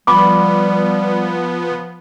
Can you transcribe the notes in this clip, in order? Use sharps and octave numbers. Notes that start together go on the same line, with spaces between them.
F3 G3 B3 B5 D6